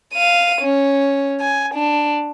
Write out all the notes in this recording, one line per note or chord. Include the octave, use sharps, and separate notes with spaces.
F5 D#7
C#4
G#5
D4